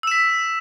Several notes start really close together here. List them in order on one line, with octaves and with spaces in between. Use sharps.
E6 E7 B6